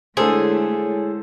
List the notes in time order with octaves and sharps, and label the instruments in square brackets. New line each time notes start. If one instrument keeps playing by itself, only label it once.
[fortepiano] D3 A4 C5 [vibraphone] G#3 E4 C#5 [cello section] A3 [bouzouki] G#4